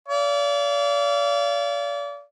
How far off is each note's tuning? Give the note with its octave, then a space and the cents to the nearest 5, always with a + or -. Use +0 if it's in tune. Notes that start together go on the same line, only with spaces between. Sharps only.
D5 -35 F5 -30